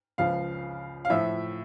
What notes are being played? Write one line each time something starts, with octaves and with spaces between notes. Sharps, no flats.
C#2 C#3 F3 F5
F5
A2 F3 E5